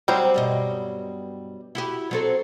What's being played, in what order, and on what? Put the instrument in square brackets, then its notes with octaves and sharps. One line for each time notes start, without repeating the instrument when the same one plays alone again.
[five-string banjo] F#3 G3 C4 [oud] C5
[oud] G2 B2 D#5
E4 F#4 G4
F#3 C4 A4